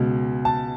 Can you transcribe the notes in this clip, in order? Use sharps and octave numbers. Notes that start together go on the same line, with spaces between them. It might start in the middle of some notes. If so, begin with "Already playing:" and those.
Already playing: C#2 B2
A5